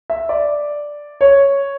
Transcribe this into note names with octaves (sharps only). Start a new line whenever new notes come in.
E5
D5
C#5